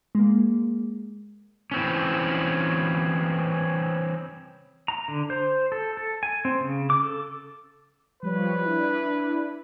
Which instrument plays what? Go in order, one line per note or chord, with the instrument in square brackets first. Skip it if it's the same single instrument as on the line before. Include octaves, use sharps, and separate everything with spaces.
[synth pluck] G#3 A#3
[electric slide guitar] E3 C4 C#4
[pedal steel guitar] A#5
D3
C5
A4
A4
G#5
C4
C#3
D6
A4
[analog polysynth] F3 G3 C#5 [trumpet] B4
[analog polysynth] D4 E4